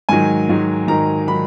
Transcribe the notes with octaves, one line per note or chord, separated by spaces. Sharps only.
G#2 D#3 F#3 G#5
G#2 D#3 F#3
G#2 D#3 F#3 A#5
D#3 F#3 B5